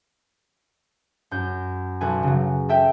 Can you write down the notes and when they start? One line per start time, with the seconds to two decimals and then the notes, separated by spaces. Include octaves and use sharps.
1.31 F#2 G6
2.01 B1 A4 B4 G#5
2.23 C#3 F#3
2.69 A4 E5 G5